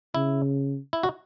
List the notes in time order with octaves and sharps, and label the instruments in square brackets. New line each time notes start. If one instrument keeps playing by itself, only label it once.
[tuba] C#3 [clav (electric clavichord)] E4
[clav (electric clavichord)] E4
F#4